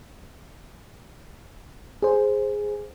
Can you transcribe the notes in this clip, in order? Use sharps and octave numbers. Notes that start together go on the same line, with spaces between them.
G#4 C5